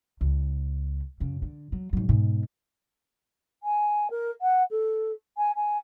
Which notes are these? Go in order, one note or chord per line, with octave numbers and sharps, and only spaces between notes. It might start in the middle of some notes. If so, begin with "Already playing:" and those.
C#2
F#2 C#3
D3
F#3
G#2 F#3
G#2 B2
G#5
A#4
F#5
A4
G#5
G#5